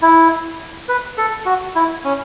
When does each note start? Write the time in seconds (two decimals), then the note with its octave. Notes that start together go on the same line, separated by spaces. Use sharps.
0.02 E4
0.88 B4
1.18 A4
1.46 F#4
1.75 E4
2.05 C#4